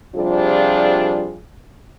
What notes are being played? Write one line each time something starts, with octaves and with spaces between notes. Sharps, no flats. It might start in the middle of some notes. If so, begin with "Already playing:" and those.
C3 F3 G3 D4 F4 G#4